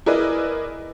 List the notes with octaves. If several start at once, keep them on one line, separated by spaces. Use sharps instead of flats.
E4 G#4 A#4 B4 D5 D#5